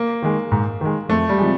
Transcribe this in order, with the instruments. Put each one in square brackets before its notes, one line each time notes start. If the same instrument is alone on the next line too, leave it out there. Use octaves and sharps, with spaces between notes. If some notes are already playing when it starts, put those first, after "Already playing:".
Already playing: [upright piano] A#3
[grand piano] D#3 G#3
G#2
D#3 G#3
[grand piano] F2 [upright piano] A3
[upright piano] G3
[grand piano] C3 F3 G#3